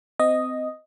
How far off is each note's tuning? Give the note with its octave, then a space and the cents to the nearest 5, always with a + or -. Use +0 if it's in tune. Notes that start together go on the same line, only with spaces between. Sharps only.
C4 -30 D#5 +0